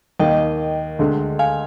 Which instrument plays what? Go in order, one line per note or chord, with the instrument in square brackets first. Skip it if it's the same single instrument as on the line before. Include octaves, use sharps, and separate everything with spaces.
[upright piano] D#2 D#3 A#3 [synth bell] D#5 G5
[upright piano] D2 D3 G#3
[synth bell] F5 G#5